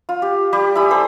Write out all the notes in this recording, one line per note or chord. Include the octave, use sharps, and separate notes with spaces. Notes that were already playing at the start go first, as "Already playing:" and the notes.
F4
G4
G3 G4
E4 G#5 B5 D#6
A4 C5